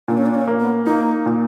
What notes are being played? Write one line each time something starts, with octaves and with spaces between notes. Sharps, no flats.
A#2 D4
C#4
D4
C#4
A#3
B3
A#3 D#4
A#2